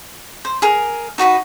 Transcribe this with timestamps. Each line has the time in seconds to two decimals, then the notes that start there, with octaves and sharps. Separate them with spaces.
0.45 C5
0.62 G#4 A#4
1.18 D#4 F#4 B4 D#5